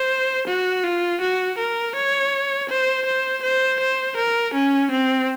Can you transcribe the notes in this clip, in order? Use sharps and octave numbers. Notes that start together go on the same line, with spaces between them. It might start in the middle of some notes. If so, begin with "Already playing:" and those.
Already playing: C5
F#4
F4
F#4
A#4
C#5
C5
C5
C5
C5
A#4
C#4
C4